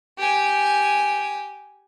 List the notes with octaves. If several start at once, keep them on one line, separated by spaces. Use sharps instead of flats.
G4 G#5